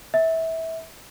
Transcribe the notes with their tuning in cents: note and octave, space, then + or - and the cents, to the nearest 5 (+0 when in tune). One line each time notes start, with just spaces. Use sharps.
E5 -20